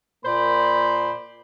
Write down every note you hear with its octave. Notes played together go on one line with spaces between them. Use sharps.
A#2 A#3 C5 D5 B5